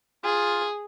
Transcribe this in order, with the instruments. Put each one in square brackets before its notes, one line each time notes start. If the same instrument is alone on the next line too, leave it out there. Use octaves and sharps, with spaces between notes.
[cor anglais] F4 [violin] G#4